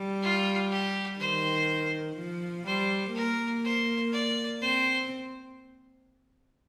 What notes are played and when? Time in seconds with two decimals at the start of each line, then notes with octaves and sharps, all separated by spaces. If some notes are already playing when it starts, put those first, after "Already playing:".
Already playing: G3
0.23 F4
0.71 G4
1.20 D#3 C5
2.17 F3
2.66 G3 C5
3.15 A#3 A#4
3.64 C5
4.12 D5
4.62 C4 C5